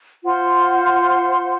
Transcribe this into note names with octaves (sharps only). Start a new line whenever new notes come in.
F4 C5 F#5 C6